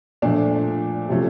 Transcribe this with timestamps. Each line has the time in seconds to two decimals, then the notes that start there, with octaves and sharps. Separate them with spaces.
0.22 A#2 F3 A3 D4
1.09 C3 F3 A3 C#4